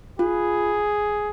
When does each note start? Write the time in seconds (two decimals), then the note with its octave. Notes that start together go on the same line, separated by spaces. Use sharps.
0.19 F4 G#4